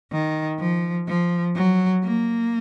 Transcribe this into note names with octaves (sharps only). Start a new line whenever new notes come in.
D#3
F3
F3
F#3
A#3